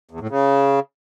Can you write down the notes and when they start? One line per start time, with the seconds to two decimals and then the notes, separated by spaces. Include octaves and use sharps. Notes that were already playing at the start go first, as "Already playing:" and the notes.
0.11 E2
0.20 A2
0.29 C#3